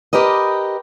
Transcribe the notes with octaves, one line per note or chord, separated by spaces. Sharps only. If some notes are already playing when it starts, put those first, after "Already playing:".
G4 A#4 B4 D#5